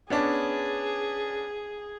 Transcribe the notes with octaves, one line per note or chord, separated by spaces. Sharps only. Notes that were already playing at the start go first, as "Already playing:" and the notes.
B3 C#4 D4 G#4